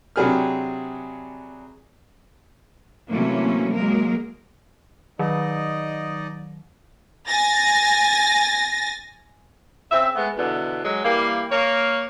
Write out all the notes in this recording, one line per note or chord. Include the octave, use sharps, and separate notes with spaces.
C3 F#3 D4 G#4 B4 F6
C3 E3 F#3 A3 A#3 C#4
F#3 G#3 A#3 A#4
D#3 F#3 D#4 D5 D#5
G#5 A6 A#6
C#3 C4 E5
G#3 A3 B3
E2 B2 D3 B3
F#3 G#3
E3 G3 A#3
A#3 C#5